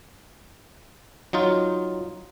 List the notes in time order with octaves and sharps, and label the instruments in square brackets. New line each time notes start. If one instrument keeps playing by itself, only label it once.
[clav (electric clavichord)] F#3 D#4 F4